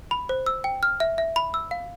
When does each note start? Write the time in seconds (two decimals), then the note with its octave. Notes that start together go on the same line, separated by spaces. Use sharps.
0.11 B5
0.29 C5
0.46 E6
0.64 G5
0.83 F6
1.00 E5
1.18 E5
1.36 B5
1.54 E6
1.71 F5